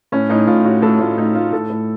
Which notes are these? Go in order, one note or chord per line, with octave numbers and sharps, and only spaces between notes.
A2 C#4
A2 D#4
A2 F4
A2 F#4
A2 A4
A2 F4
A2 D#4
A2 F4
A2 A4
A2